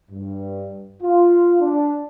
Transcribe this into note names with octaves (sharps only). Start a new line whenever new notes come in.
G2
F4
D4